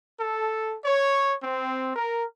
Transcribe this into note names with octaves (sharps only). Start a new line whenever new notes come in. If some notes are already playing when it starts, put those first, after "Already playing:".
A4
C#5
C4
A#4